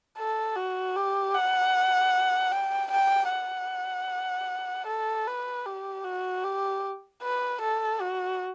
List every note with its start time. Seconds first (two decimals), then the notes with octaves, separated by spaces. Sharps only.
0.18 A4
0.56 F#4
0.96 G4
1.34 F#5
2.52 G5
2.91 G5
3.30 F#5
4.87 A4
5.27 B4
5.66 G4
6.04 F#4
6.44 G4
7.22 B4
7.61 A4
8.00 F#4